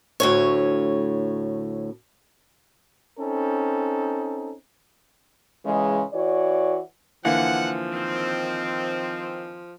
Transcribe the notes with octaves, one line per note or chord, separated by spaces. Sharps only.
D2 A2 C#5
C4 C#4 D#4 A4
C#3 E3 G#3
E3 F#4 C#5 D5
D3 E3 F3 A#3 F#5
D#3 C4